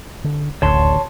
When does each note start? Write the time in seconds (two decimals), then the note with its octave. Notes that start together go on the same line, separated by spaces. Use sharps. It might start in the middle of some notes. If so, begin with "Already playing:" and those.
0.24 D3
0.62 D#1 A1 D2 D3 C#5 A5 C6